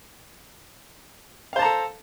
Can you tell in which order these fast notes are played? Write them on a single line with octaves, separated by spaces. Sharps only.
F5 C5 A5 A#5 A4